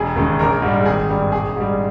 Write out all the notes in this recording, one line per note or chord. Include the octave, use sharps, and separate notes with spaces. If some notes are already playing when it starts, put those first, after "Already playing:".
Already playing: E1 G#4 G#5
D#2 C#3 G#3
A#1 A#4 A#5
G#2 G3
G#1 G#4 G#5
G2 G3
A#1 G#4 G#5
G#2 G3